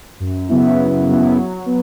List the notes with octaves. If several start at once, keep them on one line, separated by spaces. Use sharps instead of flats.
F#2
C#3 F#3 B3 E4
F#2
C#3 F#3 B3 E4
F#3
B3